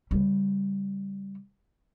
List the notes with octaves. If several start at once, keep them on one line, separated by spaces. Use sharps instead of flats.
C#3 G3